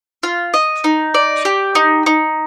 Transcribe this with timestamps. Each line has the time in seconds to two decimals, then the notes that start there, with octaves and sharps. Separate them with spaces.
0.23 F4
0.54 D#5
0.84 D#4
1.14 D5
1.45 G4
1.75 D#4
2.06 D#4